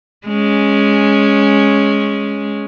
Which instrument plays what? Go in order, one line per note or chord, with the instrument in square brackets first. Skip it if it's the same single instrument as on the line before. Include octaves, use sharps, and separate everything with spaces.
[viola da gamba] G#3 C#4